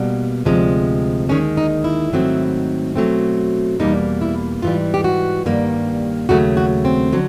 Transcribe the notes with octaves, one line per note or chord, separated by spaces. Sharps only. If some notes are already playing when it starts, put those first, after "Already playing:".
Already playing: B2 G3 A#3
D2 C3 F3 G#3
D#2 D#3 G#3 C#4
D#4
E4
G#2 D#3 F#3 A3 C4
B2 F#3 A3 C4
E2 B2 G3 A#3 D#4
E4
G#2 E3 G3 F4
G4
F#4
G2 D#3 G3 A#3
D#2 C#3 F#3 A3 F#4
F#4
C4
D3 F#3